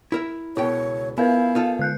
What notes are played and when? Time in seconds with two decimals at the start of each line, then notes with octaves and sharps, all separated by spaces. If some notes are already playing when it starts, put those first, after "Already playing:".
0.12 E4 A#4 E5
0.57 C#2 B2 E4 C#5 G5
1.18 B3 E4 A#4 B4 F5
1.55 D#4 F4 A4
1.79 D3 F#6 G6